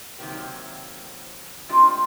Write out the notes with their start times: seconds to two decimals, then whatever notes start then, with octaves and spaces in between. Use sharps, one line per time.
0.18 C3 D#3 F#3 A#3 C4 G4
1.69 G#3 A3 C4 D4 F4 G4